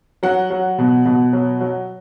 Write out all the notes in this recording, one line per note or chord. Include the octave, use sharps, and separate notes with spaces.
F#3 F#5
F#3
B2
B2
F#3
F#3